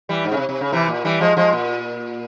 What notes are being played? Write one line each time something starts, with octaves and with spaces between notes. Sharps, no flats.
E3 G3
G#2
C#3
C3
C3
C#3
C3 E3
A#2
E3 G3
F3 G#3
F3 G#3
A#2